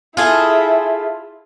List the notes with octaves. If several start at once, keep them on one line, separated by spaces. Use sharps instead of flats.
E4 F4 G#4 A4